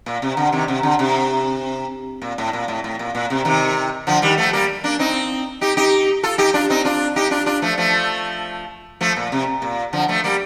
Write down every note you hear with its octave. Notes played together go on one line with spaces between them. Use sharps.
A#2
C3
D3
C3 D#3
C3
D3
C3
A#2
A2
A#2
A2
A2
A#2
A#2
C3
C3 D#3
D3 F3
D#3 G3
F3 A3
G3 A#3
A#3 D4
C4 D#4
D#4 G4
D#4 G4
F4 A4
D#4 G4
D4 F4
C4 D#4
D4 F4
D#4 G4
D4 F4
D4 F4
F3 A3
F3 A3
F3 A3
A#2
C3
A#2
D3 F3
F3 A3
G3 A#3